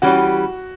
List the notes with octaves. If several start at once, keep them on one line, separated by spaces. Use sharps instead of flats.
E3 G3 C#4 F#4 G4